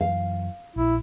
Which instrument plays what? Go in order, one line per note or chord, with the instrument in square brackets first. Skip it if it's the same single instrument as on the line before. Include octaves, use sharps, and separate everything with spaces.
[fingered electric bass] F#2 E3 [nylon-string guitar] F5
[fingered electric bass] A#1 A#2 [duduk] E4